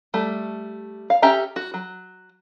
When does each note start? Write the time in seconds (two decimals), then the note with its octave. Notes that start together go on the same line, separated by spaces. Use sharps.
0.14 G3 A3
1.10 F5
1.22 C#4 G4 A4 E5 A#5
1.56 F#4
1.74 F#3